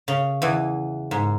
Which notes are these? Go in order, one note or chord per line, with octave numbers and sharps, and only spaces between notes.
C#3
E2 E3
G#2